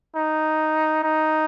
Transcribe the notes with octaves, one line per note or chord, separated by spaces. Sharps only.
D#4
D#4